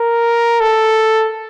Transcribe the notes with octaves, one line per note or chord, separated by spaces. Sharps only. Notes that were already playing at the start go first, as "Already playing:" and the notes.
Already playing: A#4
A4